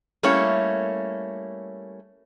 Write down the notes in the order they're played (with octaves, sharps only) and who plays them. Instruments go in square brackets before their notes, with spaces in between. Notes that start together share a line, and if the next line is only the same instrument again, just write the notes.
[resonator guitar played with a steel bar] G3 A3 A#3 C#4 E4 C#5